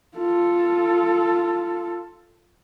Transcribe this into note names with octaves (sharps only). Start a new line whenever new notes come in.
F4 A4